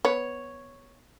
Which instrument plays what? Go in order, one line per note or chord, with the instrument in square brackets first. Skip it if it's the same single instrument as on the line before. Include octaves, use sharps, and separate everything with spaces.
[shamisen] B3 [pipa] C#5